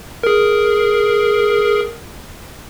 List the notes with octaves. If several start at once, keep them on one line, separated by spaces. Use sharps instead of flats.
G#4 A#4